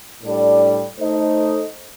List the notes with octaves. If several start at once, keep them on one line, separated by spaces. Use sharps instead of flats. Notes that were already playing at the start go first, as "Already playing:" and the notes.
A2 G3 D4 A4 D5
A3 D#4 A4 C5 D#5